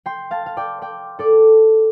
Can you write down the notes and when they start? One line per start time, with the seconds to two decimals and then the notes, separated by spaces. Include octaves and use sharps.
0.06 G5 C6
0.31 F5 A5
0.46 F5
0.57 D5 G5
0.82 D5 G5
1.19 A4 D5